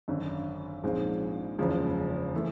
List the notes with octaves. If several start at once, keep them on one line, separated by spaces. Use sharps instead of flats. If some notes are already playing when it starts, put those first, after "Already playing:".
G#1 F#2 D3
A#1 G#2 F3 G#3 C4
F#1 E2 C#3 F3 G#3
E3 A3